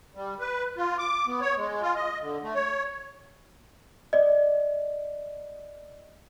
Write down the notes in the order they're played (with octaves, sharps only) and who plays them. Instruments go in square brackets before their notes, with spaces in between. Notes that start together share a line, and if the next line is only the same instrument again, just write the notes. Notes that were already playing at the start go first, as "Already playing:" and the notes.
[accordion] G3
B4
F4
D6
B3
C#5
G#3
F4
D#5
D3
A3
C#5
[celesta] D5 D#5